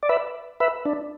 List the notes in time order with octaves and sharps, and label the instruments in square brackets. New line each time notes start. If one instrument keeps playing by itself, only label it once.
[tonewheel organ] D5
B4 E5
B4 E5
D4